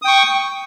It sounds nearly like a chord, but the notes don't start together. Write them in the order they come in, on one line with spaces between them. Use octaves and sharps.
D#6 G5 C#6